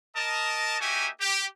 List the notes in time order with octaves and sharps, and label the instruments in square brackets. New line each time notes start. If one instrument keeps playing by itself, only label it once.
[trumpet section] A#4 D#5 A5
A#3 D#4 F#4 G4 E5 G#5
G4